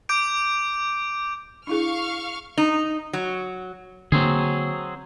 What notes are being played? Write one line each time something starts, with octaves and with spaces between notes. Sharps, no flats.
D6 G6 D7
D4 E4 G#4 F5 C#6 F6
D#4
F#3
D3 F#3 A#3 C4 G#4